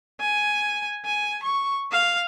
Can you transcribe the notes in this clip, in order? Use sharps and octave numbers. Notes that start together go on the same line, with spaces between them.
G#5
G#5
C#6
F5